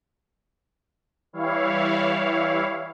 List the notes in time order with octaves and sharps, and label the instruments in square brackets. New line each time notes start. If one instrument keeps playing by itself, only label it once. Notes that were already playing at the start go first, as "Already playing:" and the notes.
[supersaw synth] E3 G3 E4 C#5 F5